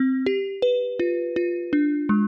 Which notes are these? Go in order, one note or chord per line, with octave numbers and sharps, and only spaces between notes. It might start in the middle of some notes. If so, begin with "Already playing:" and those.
Already playing: C4
G4
B4
F4
F4
D4
G#3